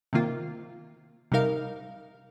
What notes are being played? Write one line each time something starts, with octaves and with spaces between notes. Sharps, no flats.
C3 D#3 A#3 F4
C3 G3 D#4 A#4 F5